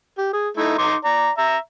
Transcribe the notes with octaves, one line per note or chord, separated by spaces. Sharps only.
G4
G#4
A3 D#4 E4
D#4 C6 D6
D5 A#5
E5 A#5